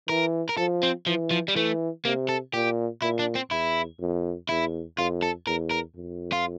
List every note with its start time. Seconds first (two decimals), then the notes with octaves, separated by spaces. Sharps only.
0.09 E3 A#4
0.49 A#4
0.57 F3 A4
0.83 C4
1.07 E3 F3
1.31 F3
1.48 G3
1.55 E3 A3
2.05 C3 A#3
2.29 A4
2.53 A#2 G4
3.02 A#2 E4
3.19 D4
3.35 C4
3.51 E2 E4
4.00 F2
4.49 E2 E4
4.98 F2 F4
5.22 A4
5.47 E2 A#4
5.71 A#4
5.96 F2
6.32 F4